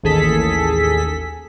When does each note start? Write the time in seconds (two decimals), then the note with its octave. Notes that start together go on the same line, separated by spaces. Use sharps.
0.03 A1 D#2 G#4 A4 B6